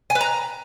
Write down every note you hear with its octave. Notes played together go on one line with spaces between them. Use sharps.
G#5
B4
A#5